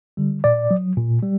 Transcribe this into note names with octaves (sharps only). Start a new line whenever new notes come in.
D3 G3
A#2 D5
F#3
A#2
G3